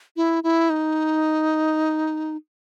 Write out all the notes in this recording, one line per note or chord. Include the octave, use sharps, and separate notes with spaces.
E4
E4
D#4